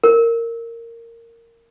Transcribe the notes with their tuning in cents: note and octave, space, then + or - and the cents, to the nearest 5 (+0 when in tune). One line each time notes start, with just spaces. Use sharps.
A#4 -15